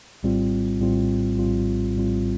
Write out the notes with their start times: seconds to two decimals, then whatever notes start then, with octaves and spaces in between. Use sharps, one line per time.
0.23 A#1 A2 G3 C4 F4
0.80 A#1 A2 G3 C4 F4
1.38 A#1 A2 G3 C4 F4
1.96 A#1 A2 G3 C4 F4